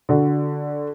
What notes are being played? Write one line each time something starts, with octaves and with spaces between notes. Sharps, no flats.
D3 F#4